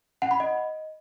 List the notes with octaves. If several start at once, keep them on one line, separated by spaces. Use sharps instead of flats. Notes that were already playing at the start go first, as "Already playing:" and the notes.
F#5
B5
D#5